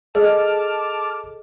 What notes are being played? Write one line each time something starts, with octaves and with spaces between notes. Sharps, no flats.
G#4 A4 D#5 A5 D6 F6